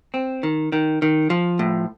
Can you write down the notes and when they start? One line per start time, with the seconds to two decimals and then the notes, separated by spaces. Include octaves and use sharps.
0.14 C4
0.43 D#3
0.72 D#3
1.02 D#3
1.30 F3
1.59 A2